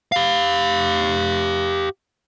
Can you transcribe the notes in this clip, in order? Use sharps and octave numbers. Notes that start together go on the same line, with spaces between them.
G4 F5